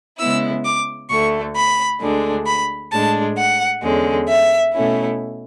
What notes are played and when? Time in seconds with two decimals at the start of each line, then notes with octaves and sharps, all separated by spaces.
0.19 C#3 G#3 B3 E4 E6
0.64 D6
1.10 D2 D3 A3 C#6
1.55 B5
2.01 D2 D3 G#3 D4
2.46 B5
2.92 A2 G#3 D4 A5
3.37 F#5
3.83 E2 D3 G#3 C#4
4.28 E5
4.74 B2 A3 C#4 E4